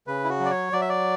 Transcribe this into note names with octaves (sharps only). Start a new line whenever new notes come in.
C#3 B4
E4
F#4
F#3
D5
C#5
F#3 D5
E5
D5